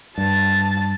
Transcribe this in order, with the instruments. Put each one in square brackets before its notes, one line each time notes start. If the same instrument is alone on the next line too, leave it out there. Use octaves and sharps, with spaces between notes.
[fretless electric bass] G2 [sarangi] A5